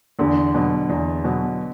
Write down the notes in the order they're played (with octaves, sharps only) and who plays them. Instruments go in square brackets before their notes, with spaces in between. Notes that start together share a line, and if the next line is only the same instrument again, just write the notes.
[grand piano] E2 [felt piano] D3
[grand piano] B2 F#3
E2
B2 F#3